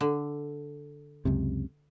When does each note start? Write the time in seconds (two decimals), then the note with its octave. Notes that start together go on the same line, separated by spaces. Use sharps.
0.01 D3
1.25 C#2 F#2 C3